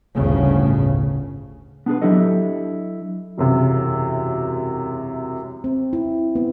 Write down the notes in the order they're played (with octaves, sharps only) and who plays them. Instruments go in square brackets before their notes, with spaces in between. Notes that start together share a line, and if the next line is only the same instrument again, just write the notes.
[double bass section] G1 D2 A2 C#3
[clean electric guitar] B3 D4 G#4 B4
F#3 D4 E4 G4 A4 D#5
[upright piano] E1 F#2 C3
[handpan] C4
E4
B3